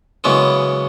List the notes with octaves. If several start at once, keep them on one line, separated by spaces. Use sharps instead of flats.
F#2 C#3 E3 G#3 B3